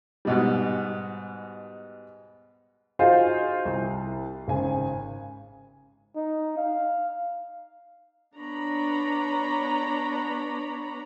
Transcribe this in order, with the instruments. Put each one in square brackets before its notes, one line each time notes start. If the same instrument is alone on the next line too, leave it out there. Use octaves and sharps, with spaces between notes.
[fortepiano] G#2 B2 G3
[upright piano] D#4 F4 F#4 G#4 C5 F5
C2
G#1 C#3 G#5
[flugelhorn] D#4
F5
[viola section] B3 D4 C#5 A#5 B5